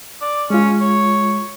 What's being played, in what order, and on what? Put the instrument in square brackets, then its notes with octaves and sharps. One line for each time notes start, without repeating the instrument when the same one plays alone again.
[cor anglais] D5
[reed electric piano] G#3 F4 [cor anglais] C#4
[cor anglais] C#5